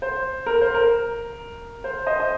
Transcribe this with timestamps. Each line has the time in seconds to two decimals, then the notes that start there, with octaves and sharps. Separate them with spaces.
0.02 C5
0.46 A#4
0.61 C5
0.74 A#4
1.84 C5
2.06 C5 D#5
2.20 D#5